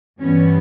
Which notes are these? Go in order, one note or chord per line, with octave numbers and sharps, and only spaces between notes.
G2 E3 G3 B3 C#4